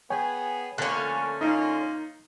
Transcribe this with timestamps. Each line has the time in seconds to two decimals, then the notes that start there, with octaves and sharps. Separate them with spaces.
0.10 B3 G#4 C#5 G5 G#5
0.78 D3 F3 A3 A#3 C#4 F#6 A6
1.41 A#3 D#4 F4